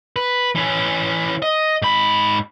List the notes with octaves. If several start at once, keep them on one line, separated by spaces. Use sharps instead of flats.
B4
E3 C#4
D#5
G#2 B5